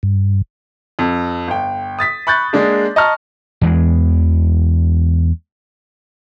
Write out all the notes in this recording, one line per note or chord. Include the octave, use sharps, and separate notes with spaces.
G2
F2
G1 G5
D#6 A6 B6
B5 C#6 F#6 G6 A6
G#3 A#3 D4 G#4
D#5 A5 A#5 C#6 F6
E2 E3 G#3